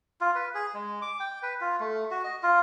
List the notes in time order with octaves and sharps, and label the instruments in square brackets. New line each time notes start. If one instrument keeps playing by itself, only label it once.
[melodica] F4
B4
G#4
G#3
D6
G5
B4
F4
A3
F#4
D#5
F4